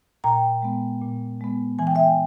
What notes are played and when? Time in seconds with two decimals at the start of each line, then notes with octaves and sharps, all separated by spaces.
0.24 A#2 G5 A#5
0.62 G#3 B3
1.01 A#2
1.41 G#3 B3
1.79 E3 G#5
1.87 G5
1.95 E5 G#5